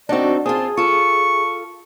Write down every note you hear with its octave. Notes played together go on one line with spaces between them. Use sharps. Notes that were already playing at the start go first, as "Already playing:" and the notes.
C4 D4 D#4 F#4 D5
C4 F4 G#4 A5
F4 A4 C#6